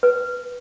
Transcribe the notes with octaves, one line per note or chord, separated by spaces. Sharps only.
B4